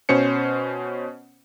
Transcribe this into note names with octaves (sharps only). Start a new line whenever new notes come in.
B2 C#4 C5 C#7